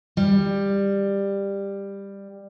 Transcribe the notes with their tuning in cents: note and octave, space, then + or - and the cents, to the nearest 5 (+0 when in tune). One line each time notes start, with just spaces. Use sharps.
G3 +15